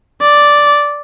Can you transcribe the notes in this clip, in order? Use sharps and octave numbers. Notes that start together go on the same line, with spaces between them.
D5